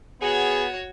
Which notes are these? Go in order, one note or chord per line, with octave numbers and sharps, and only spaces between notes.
B3 F#4 G#4 C#5